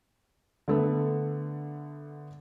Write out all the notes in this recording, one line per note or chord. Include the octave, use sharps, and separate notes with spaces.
D3 A3 B3